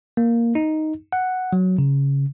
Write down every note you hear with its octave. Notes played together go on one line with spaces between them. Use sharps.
A#3
D#4
F#5
F#3
C#3